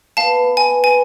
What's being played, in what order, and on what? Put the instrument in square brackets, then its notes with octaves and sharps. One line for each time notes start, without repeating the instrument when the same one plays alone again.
[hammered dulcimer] B3 [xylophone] F5 A5
[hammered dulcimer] B3
[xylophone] G#5
[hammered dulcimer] B3
[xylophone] G#5